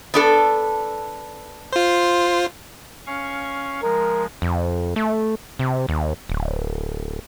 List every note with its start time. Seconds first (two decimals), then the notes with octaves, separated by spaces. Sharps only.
0.14 B3 D4 A4
1.72 F4 C5
3.07 C#4 F5 C#6
3.83 F3 G#3 A#4
4.42 F2
4.96 A3
5.59 C3
5.89 D#2
6.29 D1